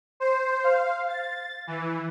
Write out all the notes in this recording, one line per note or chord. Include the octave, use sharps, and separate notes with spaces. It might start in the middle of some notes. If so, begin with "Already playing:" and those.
C5
F5
A6
E3